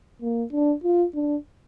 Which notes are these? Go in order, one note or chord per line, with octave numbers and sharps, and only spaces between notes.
A#3
D4
F4
D4